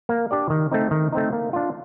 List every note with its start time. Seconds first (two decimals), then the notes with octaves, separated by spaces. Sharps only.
0.09 A#3
0.31 D4 G4 D5
0.50 D#3
0.72 A3 C4 D#4
0.91 D#3
1.12 A3 C4 D#4
1.33 A#3
1.53 D4 F4